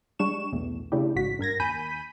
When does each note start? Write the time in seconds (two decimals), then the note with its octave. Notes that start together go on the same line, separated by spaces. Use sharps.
0.19 G3 G#3 D4 C#6 E7
0.53 B1 E2 A2
0.92 C#3 A3 D4 E4 G4
1.16 A1 G#2 F#4 B6
1.39 G2 A#4 G#6 A#6
1.60 D#2 G#5 B5 G6 B6 D#7